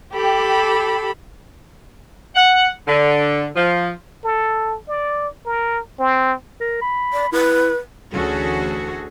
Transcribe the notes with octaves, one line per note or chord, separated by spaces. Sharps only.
G4 A4 B5
F#5
D3
F3
A4
D5
A#4
C4
A#4
B5
D5
E4 B4
D2 E3 C#4 F#4 G#4 A4